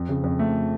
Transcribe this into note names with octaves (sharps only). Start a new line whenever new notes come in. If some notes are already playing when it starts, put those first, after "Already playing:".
Already playing: F2
C#3
F2
A3